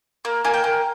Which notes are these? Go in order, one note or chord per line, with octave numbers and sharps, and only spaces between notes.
A#3
A#3 G#5
G5
A#3